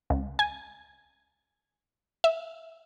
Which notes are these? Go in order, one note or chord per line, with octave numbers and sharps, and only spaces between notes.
C#2
G#5
E5